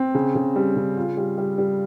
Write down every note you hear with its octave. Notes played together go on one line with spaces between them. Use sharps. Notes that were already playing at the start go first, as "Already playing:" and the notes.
Already playing: C4
C#3
C#3
G3
C#3
F4
G3
G3
G3